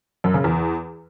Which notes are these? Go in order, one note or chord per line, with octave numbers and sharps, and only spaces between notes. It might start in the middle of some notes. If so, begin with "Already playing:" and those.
F#2
C#3
E2